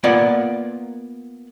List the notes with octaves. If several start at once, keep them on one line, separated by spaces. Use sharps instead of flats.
A#3 B3 F4 D5 F#5